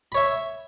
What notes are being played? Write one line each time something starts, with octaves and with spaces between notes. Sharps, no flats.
C#5 E5 B5